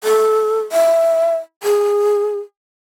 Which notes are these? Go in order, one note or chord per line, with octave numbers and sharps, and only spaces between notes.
A4
E5
G#4